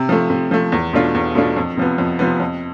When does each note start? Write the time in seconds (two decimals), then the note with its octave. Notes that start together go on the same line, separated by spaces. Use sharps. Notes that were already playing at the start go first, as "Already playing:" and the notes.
Already playing: C3
0.09 F3 A3
0.30 C3
0.51 F3 A3
0.72 E2
0.93 B2 A3 D4 F4
1.15 E2
1.35 B2 A3 D4 F4
1.57 F2
1.77 C3 F3 B3
1.98 F2
2.19 C3 F3 B3
2.40 F2